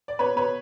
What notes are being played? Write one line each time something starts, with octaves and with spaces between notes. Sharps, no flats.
D5
B2 B4 C#5
B2 B4 C#5